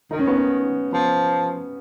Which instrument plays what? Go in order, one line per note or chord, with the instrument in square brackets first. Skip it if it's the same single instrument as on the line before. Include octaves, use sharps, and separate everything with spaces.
[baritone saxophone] D#3 [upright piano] D#4
[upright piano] C#4
B3
C#4
[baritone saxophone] F3 [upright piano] B3